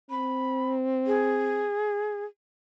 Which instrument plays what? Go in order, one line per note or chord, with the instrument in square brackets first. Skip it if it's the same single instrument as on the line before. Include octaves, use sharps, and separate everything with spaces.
[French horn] C4 [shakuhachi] B5
[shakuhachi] G#4